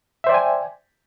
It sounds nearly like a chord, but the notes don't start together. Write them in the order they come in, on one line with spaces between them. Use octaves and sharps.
E5 C5 D5 G5 G#5